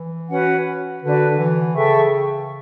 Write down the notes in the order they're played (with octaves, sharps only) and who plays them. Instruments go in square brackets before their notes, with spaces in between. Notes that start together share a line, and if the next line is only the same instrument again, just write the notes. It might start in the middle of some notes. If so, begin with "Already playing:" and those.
Already playing: [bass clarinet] E3
[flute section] C#4 F#4 B4 F#5
[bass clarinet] D3 [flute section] D4 F#4 B4
[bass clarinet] E3
[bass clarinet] C#3 [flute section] A4 E5 G5 C#6